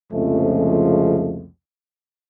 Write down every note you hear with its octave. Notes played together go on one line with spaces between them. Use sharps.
C2 F2 C#3 F3 G#3 A3